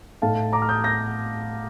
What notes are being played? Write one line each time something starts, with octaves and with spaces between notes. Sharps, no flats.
A2 A3 D#4 F5 A5
A#5 D6
F6
D#6 G6
G6 A#6